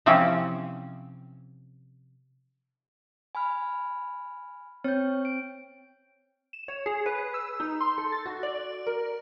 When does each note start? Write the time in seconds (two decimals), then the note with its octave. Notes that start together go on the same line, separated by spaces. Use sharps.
0.06 C3 E3 F3 C4 C#4
3.35 G#5 B5 F6
4.84 C4 C#5 G6
5.25 D7
6.53 E7
6.68 C#5
6.86 G#4
7.06 B4
7.34 E6
7.60 D#4
7.81 C6
7.98 A4
8.12 A6
8.26 F#4
8.43 D5
8.87 A#4